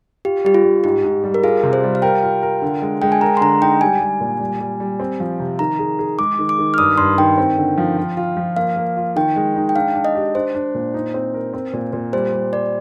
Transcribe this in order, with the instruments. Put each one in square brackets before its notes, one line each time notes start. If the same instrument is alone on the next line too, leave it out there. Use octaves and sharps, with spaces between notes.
[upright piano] F4 [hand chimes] G4
[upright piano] G3 [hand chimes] G4
[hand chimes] F4
[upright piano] G3
[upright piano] G#2 [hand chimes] G4
[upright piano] G#2
G3
[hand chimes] A#4
[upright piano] F4 [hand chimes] G#4
[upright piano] C3
[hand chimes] C5
[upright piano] G3
[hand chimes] F5
[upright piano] A#4 [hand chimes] G5
[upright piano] F4
A#4
D3
G#3
[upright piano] G#3 [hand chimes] G5
[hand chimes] G#5
[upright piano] A#4 [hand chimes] A#5
[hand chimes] C6
[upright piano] D3 [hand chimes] A#5
[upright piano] D#4 [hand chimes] G5
[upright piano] G3 [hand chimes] G#5
[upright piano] G3
A#2
G3
G3
G3
C4
F3
C3
[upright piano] D#3 [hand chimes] A#5
[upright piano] G#4
G#4
[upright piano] G#3 [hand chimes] D6
[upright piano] D#3
[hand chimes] D6
[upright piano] D#3
[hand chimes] F6
[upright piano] G2 [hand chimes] D#6
[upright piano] G2 [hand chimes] C6
[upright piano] D#3 [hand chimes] G5
[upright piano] C4
D3
F3
F4
F4
F3
[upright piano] A#3 [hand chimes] F5
[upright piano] A#3
F4
[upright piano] D#3 [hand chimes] G5
[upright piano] G#3
D#4
[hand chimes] G5
[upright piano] D4 [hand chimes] F5
[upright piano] D4
[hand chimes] D#5
[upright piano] G4
[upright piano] D4 [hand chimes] C5
[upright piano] D4
A#2
D#4
C4
A#4
C4
A#2
A#2
[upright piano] G3 [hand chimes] C5
[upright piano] G3
[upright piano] C5 [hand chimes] D5